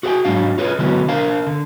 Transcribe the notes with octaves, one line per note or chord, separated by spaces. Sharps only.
F#4 G#4 B4 F5 G5 G#5
G#2 F#3 D4 F5
F4 G#4 B4 C#5
D3 F#3 G#3 B3 E4 B4
D4 A#4 C5 F5
D3